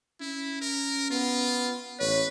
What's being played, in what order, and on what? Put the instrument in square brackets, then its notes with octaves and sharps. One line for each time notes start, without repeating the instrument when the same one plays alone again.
[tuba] C#4 [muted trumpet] E4
[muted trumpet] A#4
[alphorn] B3 [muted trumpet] F4
[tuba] A1 [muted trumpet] B4 [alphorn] C#5